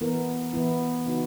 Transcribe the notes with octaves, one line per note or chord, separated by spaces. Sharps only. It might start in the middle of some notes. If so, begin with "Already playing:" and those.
E3 B3 E4 A#4
E3 B3 E4
C#3 E3 B3 D#4 F#4